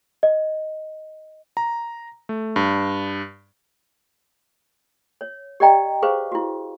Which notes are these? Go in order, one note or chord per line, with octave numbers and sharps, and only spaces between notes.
D#5
A#5
A3
G2
C#5
G4 D5 D#5 G5 A#5
G#4 B4 C5 F5 C#6
E4 F#4